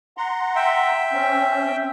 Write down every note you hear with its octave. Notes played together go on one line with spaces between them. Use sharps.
F#5 A#5 C6
E5 G5
C4 C#4